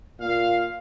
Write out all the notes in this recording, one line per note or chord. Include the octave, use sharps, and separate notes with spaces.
A#2 F5